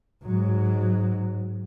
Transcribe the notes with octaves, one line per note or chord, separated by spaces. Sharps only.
G#2 F#3